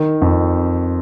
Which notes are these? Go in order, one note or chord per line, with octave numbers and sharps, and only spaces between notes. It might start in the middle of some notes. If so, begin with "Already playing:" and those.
Already playing: D#3
F2